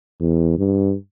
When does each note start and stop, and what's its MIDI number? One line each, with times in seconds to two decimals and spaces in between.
0.21 0.57 40
0.58 0.95 43